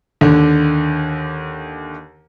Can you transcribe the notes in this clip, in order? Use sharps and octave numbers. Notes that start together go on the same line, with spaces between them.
D#2 D3